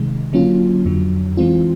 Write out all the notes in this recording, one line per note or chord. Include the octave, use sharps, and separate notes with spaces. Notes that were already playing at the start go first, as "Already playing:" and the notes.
Already playing: C3 D#3 G#3
D3 F#3 A#3 C#4 F4
F2 D3 F#3
E3 G#3 C4 F4